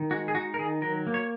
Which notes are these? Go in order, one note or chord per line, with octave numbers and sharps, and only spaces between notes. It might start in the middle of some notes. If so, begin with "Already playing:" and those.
Already playing: D#3
G#3 F#4
G#4
D#4 F#4
A#4
D#3 G#4
F#3 A#4
A#3
C#5